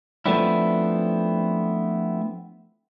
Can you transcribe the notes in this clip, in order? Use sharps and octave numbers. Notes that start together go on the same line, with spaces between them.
F3 A3 B3 C4 D4 E4